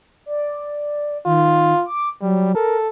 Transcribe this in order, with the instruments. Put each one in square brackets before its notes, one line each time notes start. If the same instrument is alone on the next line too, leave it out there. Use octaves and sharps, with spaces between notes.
[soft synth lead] D5
[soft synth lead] D#3 [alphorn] F4
[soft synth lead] D6
[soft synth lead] F#3 [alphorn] G3
[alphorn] A4 [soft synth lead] A#4